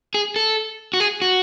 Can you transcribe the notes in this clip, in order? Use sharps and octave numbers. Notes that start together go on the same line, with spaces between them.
G#4
A4
F#4
G#4
F#4